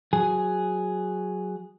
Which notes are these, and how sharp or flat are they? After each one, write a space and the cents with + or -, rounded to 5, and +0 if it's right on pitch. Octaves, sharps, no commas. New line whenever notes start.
F#3 +0 G#4 +0